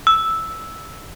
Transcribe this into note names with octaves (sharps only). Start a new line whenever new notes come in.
E6